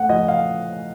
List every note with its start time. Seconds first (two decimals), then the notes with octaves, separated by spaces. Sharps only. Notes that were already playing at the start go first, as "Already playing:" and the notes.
Already playing: A3 F#5
0.09 F3 D#5
0.28 F5